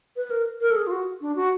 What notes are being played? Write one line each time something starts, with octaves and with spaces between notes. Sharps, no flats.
B4
A#4
A#4
A4
G#4
F4
F#4
D4
F#4